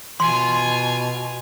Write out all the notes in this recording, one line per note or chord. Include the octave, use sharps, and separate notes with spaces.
B2 F4 G#5 C6